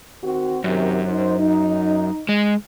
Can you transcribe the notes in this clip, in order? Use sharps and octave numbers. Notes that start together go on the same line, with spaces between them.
D#3 C4 F#4
F#2 C3 D#3
D#4 C5
D#4
G#3